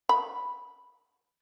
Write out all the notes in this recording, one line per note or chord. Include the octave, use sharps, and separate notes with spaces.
B5